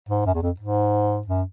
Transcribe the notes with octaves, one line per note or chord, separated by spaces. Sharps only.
G#2
F#2
E2
F2
G#2
F#2